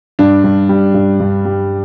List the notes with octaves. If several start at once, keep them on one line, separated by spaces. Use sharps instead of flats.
G2 D4
G2
G3
G2
G2
G3